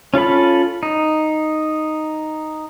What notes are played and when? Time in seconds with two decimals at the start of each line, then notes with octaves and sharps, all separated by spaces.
0.14 C#4 F4 A4 B5
0.83 D#4